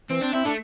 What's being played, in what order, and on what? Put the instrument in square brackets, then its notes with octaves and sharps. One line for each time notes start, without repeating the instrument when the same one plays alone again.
[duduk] E3 [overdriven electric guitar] C4
[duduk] C4 [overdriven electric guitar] D4
[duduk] C4 [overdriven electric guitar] E4
[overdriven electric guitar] A3 [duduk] D4